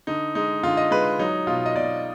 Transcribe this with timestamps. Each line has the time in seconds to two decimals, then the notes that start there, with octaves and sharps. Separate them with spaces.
0.07 D3 D#4
0.35 G#3 D#4
0.63 D3 F4
0.77 D#5
0.91 G#3 B4
1.19 F#3 D#4
1.47 B2 F4
1.66 D#5
1.76 B2 D5